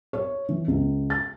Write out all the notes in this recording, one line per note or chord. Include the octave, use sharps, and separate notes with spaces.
C#5
E3
C#2
A6